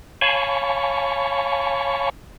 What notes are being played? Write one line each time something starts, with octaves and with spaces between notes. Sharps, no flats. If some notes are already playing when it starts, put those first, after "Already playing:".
C#5 F5 G#5 A5 B5 C#6